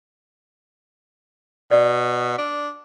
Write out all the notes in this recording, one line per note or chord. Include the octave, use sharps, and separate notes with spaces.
B2 D5
D4